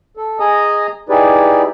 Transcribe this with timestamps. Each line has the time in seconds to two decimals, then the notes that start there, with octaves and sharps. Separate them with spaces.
0.17 A4
0.40 G#4 D#5 G#5 A#5 D#6
1.09 D#4 E4 G4 G#4 B4 D5